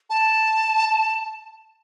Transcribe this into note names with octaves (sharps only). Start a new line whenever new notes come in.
A5